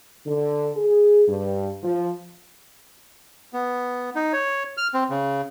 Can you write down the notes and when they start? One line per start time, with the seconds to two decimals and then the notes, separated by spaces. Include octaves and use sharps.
0.25 D3
0.76 G#4
1.28 G2
1.83 F3
3.53 B3
4.15 D#4
4.33 C#5
4.77 F6
4.94 C4
5.10 C#3